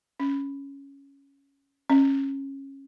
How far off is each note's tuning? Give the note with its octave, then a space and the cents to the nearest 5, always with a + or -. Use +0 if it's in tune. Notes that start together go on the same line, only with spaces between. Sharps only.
C#4 +0
C#4 -20